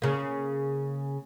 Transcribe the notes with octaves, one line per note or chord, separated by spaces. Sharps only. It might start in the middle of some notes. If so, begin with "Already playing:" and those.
C#3 A#3